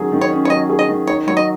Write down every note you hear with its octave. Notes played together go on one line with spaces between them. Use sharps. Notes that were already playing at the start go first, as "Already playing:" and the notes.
Already playing: D#3 F#3 C#4 G#4
D#3
C#5
C#4
C#5
F#3 D#5
G#4
D#5
D#3
D#4 C#5
F#3 C#5
D#5